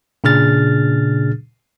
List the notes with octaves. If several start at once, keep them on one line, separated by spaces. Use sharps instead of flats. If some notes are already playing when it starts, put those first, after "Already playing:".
A#2 C#3 D4 G#4 F6 A6